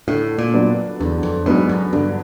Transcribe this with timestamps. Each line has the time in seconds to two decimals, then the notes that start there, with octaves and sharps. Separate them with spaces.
0.08 A2 D3
0.38 A#2
0.54 F#3 B3 D4
0.99 E2 D3
1.23 F2
1.46 G#2 F#3 B3 D4
1.69 F#2
1.93 G2 D3